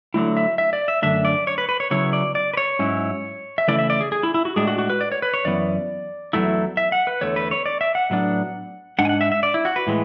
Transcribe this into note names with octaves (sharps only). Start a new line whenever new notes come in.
D3 F#3 A3 E4
E5
E5
D5
E5
F#2 D3 A3 D4 E5
D5
C#5
B4
B4
C#5
C#3 F#3 B3 E4 C#5
D5
D5
B4
C#5
G#2 F#3 C#4 E4
E5
C#3 E3 A3 E4 D5
E5
D5
G#4
G#4
E4
E4
F#4
A2 G#3 D4 G#4
F#4
F#4
B4
D5
C#5
B4
C#5
F#2 E3 B3 D5
E2 C#3 F#3 A3 E4
E5
F#5
B4
E2 D3 A3 C#5
B4
C#5
D5
E5
F#5
A2 F#3 B3 D4
G#2 G#3 D4 F#5
G#5
F#5
E5
E5
D5
E4
F#4
B4
A2 E3 G#3